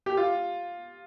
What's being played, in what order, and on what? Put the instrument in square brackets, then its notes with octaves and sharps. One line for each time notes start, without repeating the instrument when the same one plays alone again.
[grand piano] G4
F4